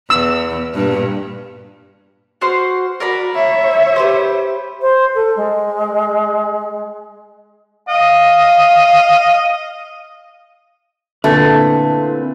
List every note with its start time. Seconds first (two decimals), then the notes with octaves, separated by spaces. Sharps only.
0.10 E2 E6
0.74 G2 A#2
2.41 F#4 C5 F6
3.00 F#4 A#4 D5 B5
3.34 C#5 E5
3.96 G4 B4 C5
4.81 C5
5.15 A4
5.36 G#3
7.88 D#5 F5
11.24 A#2 D3 A3 C4 E4 A4 B4